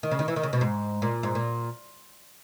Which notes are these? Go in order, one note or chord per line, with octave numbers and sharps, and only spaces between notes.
D#3
C#3
D#3
E3
D#3
C#3
B2
G#2
A#2
G#2
A#2